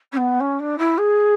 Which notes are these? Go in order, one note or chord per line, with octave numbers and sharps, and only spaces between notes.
C#4
B3
C#4
D4
E4
G#4